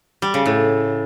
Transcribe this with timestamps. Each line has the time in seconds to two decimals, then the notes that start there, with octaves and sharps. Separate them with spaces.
0.22 G3
0.34 C#3
0.46 A2